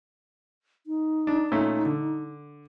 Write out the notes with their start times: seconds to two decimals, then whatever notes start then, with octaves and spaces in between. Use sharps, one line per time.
0.87 D#4
1.27 D4
1.52 A#2 A3 C#4
1.85 D3